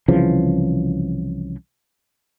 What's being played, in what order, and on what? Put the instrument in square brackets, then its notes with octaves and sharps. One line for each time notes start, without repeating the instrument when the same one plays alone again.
[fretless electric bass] C2 C#3 E3 F3